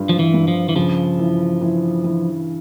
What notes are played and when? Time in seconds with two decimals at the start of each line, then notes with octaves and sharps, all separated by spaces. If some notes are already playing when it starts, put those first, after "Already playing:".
Already playing: G2 F4
0.09 F3
0.19 E3
0.34 G2
0.48 F3
0.69 E3
0.75 C#3 F3
1.19 E3
1.61 E3
2.04 E3